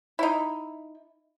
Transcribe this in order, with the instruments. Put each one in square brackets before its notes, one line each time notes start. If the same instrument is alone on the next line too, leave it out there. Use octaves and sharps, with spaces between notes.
[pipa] D#4 E4